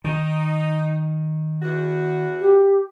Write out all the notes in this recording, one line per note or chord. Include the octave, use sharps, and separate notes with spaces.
D#3 D#4
E2 F#4
G4